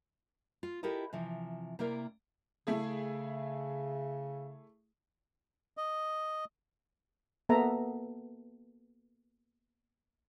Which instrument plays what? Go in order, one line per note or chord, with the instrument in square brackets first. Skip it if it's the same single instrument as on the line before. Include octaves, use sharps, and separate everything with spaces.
[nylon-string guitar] F4
E4 F4 G4 A4 A#4 D#5
C3 E3 F3
C3 A#3 E4 A#4 D5
[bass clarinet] C#3 [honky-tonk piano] A3 E4 G#4
[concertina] D#5
[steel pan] A#3 B3 A4 E5 A#5